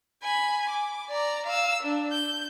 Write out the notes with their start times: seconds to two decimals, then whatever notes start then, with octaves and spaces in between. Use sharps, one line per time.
0.24 G#5 B5
0.70 D6
1.10 D5 A#5
1.46 F5 E6
1.83 D4
2.12 G6